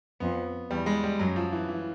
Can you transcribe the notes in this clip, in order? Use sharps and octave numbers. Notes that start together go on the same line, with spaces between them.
F2 B3
E2 G3
G#3
G3
F#2 F#3
F3
E3
E3